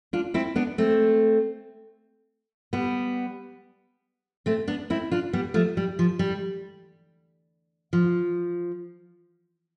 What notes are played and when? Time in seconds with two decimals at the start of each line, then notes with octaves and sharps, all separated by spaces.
0.13 D4 F4
0.34 C4 E4
0.56 B3 D4
0.78 A3 C4
2.73 G3 B3
4.46 A3 C4
4.68 B3 D4
4.90 C4 E4
5.11 D4 F4
5.33 G3 B3
5.54 F3 A3
5.77 G3
5.99 F3
6.19 G3
7.93 F3